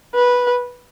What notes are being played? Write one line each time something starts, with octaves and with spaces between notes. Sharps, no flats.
B4